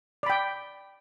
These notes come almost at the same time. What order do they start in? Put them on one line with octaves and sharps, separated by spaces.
D5 B5 G5